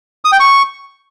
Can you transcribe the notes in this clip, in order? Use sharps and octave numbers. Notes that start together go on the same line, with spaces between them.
D#6
G5
C#6